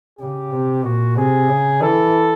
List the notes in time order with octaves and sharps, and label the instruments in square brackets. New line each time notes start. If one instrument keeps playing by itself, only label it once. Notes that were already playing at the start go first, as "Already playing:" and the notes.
[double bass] C#3 [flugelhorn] G4
[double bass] C3
[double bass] A#2 [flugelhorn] F#4
[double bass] C3 [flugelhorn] G#4
[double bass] C#3
[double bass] E3 [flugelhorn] A4